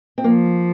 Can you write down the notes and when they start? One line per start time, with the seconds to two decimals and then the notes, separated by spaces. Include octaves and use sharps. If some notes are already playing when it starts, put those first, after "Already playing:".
0.18 C4
0.24 F3 A#3